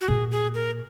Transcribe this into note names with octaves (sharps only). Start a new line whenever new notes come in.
F#4
A#2 G#4
G#4
A#4